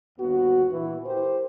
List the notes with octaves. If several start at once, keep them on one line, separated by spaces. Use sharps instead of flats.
G1 D#2 B3 F#4
A#2 E3
E4 G4 A#4 C5